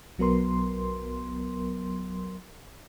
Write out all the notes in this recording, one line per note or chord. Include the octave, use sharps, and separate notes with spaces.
B1 F#3 B3 A#4 C6